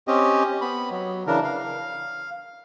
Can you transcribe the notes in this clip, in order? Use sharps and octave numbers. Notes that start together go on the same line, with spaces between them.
C4 C#4 G4 D#5
B3 B5
F#3
C#3 E3 D4 A#4
F5